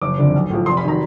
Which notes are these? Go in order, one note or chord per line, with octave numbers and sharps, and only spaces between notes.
F#1 D6
F2 D3
B1
A2 F3
F1 C6
B5
D#3 F#3 A#5